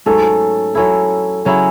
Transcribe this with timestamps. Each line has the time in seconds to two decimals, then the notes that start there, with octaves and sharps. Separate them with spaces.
0.06 G#2 F#3 A3 C#4 A4
0.75 F#3 C#4 E4 A4
1.45 C#3 F#3 C#4 E4